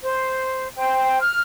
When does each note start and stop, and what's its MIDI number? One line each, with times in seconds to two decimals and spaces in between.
0.03 0.66 72
0.76 1.20 72
0.76 1.20 79
1.20 1.40 89